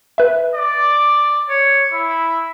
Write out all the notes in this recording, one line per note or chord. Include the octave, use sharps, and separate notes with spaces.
B4 E5
D5
C#5
E4